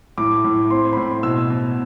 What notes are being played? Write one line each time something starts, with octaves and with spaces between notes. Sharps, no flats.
A2 D6
A2
C4 C6
B5
A2 C6
B2 E6
B2